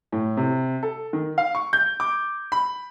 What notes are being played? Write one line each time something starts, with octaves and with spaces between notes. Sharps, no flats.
A2
C3
A4
D#3
F5
C#6
G6
D6
B5